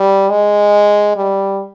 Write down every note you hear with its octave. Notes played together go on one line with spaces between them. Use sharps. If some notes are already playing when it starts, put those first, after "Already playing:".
Already playing: G3
G#3
G3